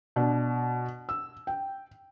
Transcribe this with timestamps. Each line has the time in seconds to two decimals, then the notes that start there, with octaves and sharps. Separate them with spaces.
0.16 B2 D4
1.09 E6
1.47 G5